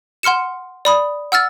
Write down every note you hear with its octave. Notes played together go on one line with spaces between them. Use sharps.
F#5 C6 F6 C#7 E7
D5 B5 D#6
F#5 E6 F6 A6